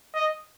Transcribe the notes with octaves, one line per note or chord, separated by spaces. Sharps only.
D#5